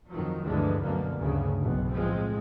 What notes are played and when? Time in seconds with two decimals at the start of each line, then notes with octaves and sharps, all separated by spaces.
0.10 F2 D#3 F3 F#3
0.44 D2 G2 D3 E3 F3 G#3
0.81 F#2 B2 D3 F3 A#3
1.19 D2 G2 C#3
1.59 F#1 B1 B2
1.93 A2 F3 G#3 C4